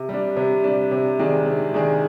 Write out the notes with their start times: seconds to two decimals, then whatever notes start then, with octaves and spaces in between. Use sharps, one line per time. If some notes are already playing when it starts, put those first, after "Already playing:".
Already playing: C3
0.09 G3 D4
0.37 C3
0.64 G3 D4
0.92 C3
1.19 D#3 G#3 D4 G#4
1.47 C3
1.74 D#3 G#3 D4 G#4